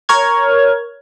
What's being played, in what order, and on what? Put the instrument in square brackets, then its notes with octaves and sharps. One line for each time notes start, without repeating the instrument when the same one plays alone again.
[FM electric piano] A#4 C#5 F6 G#6